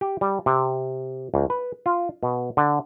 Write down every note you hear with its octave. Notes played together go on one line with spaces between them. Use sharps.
G4
G3
C3
C#2
B4
F4
B2
D3